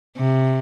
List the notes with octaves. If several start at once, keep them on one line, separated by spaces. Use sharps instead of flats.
C3